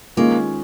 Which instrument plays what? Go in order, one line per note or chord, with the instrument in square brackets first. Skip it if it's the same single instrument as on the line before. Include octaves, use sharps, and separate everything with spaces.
[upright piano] D#3 G#3 C#4 F4 G#4 [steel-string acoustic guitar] A#3